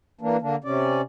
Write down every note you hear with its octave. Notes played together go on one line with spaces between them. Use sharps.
E3 A#3 D4
D3 A#3 D4
C3 C#4 D5